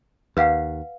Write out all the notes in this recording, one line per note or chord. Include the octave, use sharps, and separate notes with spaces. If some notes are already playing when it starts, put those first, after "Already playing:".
D#2 B4 F5 F#5